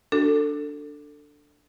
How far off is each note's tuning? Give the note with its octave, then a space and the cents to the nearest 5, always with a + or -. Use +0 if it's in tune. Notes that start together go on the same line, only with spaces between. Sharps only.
D4 +0 F#4 +0 A4 +20